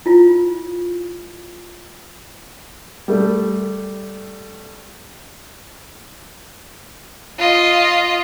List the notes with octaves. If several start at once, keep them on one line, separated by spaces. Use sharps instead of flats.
E4 F4
G3 A3
F4 D#5